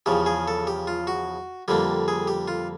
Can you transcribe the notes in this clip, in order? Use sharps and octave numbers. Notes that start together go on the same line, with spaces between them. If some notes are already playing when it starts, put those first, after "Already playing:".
E2 C#3 F3 G4
G#4
A4
G4
F4
F#4
F2 D3 G3 A#3 G4
G#4
G4
F4